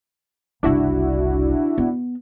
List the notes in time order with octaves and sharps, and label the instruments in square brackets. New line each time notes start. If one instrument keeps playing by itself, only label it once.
[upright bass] F#1 C2 [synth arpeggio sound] D4 E4 F#4
[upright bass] B3